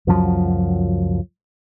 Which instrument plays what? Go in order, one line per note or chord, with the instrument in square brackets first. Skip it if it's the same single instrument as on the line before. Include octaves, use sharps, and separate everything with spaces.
[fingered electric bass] C#2 F#2 F3 F#3